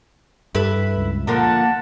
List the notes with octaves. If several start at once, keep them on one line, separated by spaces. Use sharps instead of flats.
G2 E4 A4 B4
C#2
A#2 D3 F3 A#3 A#4 F#5 A5